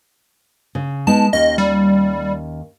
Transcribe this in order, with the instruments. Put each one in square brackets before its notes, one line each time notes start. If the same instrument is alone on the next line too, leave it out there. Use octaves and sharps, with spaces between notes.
[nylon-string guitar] C#3
[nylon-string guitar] G#3 B3 D#4 [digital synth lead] A5
[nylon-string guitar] D#2 D#3 C#4 [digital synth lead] D#5
[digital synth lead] G3